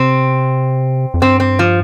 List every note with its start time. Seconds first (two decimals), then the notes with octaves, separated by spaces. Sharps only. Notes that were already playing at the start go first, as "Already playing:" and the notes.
Already playing: C3 C4
1.14 F2
1.21 G2 C4
1.40 C4
1.59 F3